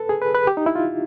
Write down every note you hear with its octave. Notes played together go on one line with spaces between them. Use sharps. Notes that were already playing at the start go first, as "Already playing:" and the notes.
Already playing: A4 B4
G#4
B4
B4
G4
D#4
E4
F4